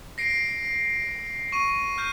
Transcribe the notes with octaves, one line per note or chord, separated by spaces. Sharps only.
A#6 C7 D7
C#6 D#7
F6 G6 D#7